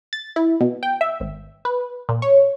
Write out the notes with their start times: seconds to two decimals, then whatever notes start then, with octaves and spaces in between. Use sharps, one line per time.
0.13 A6
0.36 E4
0.61 B2
0.83 G5
1.01 E5
1.20 G#1
1.65 B4
2.09 A#2
2.22 C#5